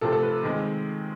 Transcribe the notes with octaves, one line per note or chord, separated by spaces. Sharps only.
C3 F3 A3 C4 A4
A4
B4
D#3 G#3 C4